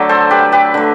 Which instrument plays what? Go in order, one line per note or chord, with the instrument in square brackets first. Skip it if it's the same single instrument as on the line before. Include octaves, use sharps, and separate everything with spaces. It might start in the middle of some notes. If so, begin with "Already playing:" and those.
Already playing: [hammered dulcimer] D3 F#3 A3 D5 E5
A4 C5
G4 B4
G4 B4
D3 A3